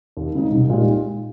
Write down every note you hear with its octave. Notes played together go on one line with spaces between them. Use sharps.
D#2
C#3 G#3 D#4
C2
A#2 G#3 D#4 G4